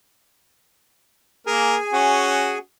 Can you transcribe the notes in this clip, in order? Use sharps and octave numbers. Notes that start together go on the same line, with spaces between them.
A#3 G#4 A#4 G#5
C#4 F#4